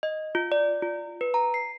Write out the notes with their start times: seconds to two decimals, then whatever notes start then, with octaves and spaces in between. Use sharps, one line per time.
0.03 D#5
0.35 F4
0.52 D5
0.82 F4
1.21 B4
1.34 A#5
1.54 C7